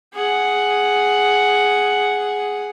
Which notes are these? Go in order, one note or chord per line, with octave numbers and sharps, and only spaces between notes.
G#4 F#5